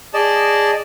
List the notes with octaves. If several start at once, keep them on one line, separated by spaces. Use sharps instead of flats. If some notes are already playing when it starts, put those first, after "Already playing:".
G#4 D5 D#5 A5